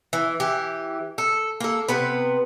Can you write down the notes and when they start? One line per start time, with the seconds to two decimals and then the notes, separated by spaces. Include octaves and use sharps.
0.13 E3
0.40 E3 G4
1.18 A4
1.60 A#3 A4
1.88 C3 B3 B4